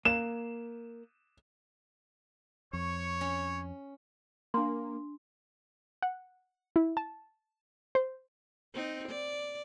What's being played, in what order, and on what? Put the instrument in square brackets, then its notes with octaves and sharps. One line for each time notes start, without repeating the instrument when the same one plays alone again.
[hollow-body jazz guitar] A#3 [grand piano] E7
[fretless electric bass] F2 [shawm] C#5 [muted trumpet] C#6
[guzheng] C#4
[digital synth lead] A#3 [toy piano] D4 C6
[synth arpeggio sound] F#5
E4
A5
C5
[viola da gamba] C4 D#4
D5